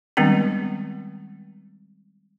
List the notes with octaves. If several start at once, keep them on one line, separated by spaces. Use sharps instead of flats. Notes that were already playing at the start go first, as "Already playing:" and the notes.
D#3 G3 G#3 B3 C4 D4